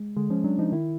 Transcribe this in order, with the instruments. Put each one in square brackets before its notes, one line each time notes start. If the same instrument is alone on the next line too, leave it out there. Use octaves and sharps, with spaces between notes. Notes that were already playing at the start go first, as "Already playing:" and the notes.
Already playing: [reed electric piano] G#3
[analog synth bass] D3 [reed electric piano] G#3
[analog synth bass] F3 [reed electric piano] C#4
[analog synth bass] F#3 [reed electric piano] D4
[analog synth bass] F3 [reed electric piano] D#4
[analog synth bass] D#3 [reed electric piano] E4